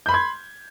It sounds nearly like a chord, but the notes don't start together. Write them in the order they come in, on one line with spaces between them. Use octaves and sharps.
G6 B5 C6 G#6